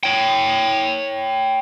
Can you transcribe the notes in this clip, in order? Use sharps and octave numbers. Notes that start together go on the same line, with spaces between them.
C#5 G5